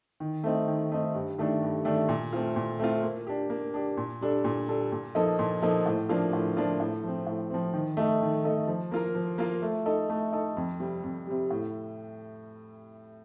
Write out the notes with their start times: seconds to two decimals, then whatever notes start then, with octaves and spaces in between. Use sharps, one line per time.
0.20 D#3
0.44 A3 C4 D#4
0.68 D#3
0.92 A3 C4 D#4
1.14 G2
1.38 D#3 A3 D4 A4
1.62 G2
1.85 D#3 A3 D4 A4
2.09 A#2
2.33 A3 C4 F4
2.56 A#2
2.79 A3 C4 F4
3.03 A#3
3.27 D4 G4
3.50 A#3
3.74 D4 G4
3.97 A#2
4.21 G3 D4 A4
4.44 A#2
4.68 G3 D4 A4
4.92 A#2
5.15 F3 A#3 D#4 A4
5.39 A#2
5.62 F3 A#3 D#4 A4
5.86 A2
6.09 F3 A#3 D4 F4
6.33 A2
6.57 F3 A#3 D4 F4
6.80 A2
7.04 F3 C4
7.27 A2
7.50 F3 C4
7.73 D#3
7.97 A3 D#4 A4
8.22 D#3
8.44 A3 D#4 A4
8.68 F3
8.91 A#3 F4 A#4
9.15 F3
9.38 A#3 F4 A#4
9.62 A3
9.86 D#4 A4
10.10 A3
10.32 D#4 A4
10.57 F2
10.80 C3 G3
11.03 F2
11.27 C3 G3
11.50 A2